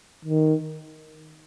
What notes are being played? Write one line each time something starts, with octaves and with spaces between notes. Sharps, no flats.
D#3